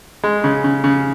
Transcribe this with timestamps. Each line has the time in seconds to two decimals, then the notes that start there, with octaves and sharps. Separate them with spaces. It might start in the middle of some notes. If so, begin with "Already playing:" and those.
0.24 G#3
0.44 C#3
0.64 C#3
0.84 C#3